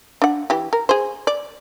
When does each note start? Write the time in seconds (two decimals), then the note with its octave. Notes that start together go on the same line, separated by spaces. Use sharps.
0.22 D4 F#5
0.50 E3 G4
0.73 A#4
0.89 G#4 C5
1.27 D5